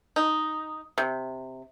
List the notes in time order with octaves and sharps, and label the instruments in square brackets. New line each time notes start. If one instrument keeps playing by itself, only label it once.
[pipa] D#4
C3